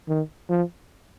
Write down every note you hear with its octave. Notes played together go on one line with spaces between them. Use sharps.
D#3
F3